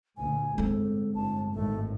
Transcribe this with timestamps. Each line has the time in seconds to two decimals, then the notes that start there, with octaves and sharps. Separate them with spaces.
0.17 D2 A#2 G#5
0.58 G1 A2 G#3 C4 A4
1.15 G1 A5
1.53 G#1 A2 A3